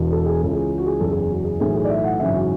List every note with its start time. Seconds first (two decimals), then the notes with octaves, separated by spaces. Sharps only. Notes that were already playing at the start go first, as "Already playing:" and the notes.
Already playing: E1 E2 B2
0.12 A4
0.26 G#4
0.40 C#2 C#3 E3 A4
0.53 G#4
0.78 F#4
0.86 G#4
1.00 F#1 E2 C#3 E3 A4
1.10 G#4
1.20 G#4
1.30 F#4
1.44 G#4
1.60 B1 A2 E3 G#4
1.74 G#4
1.84 D5
1.90 E5
2.04 F#5
2.19 G#1 F#2 C#3 E3 E5
2.34 F#4